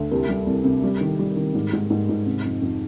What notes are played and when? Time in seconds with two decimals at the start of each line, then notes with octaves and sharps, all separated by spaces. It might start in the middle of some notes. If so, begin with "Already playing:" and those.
Already playing: D2
0.11 C2 G4 A#4
0.29 G3
0.46 C2
0.64 C3
0.84 G3
1.01 D#3
1.19 G3
1.37 D#3
1.54 G#2
1.73 G#2
1.90 G#2
2.09 G#2
2.26 C3
2.45 F2
2.62 F2